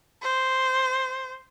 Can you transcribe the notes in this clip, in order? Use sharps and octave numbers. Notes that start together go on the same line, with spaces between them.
C5